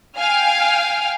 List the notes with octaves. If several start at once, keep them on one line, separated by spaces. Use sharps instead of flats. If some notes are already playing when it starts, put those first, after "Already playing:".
F5 G5 G#5 F6